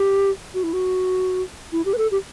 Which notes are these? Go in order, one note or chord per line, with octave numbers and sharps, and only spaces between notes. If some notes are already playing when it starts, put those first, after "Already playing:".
Already playing: G4
F#4
E4
F#4
E4
G4
B4
A4
G4